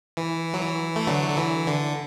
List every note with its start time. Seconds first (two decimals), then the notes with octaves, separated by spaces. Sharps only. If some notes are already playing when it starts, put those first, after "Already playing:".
0.17 E3
0.54 F#3
0.62 E3
0.96 A3
1.07 D3 F#3
1.29 D3
1.37 E3
1.67 D3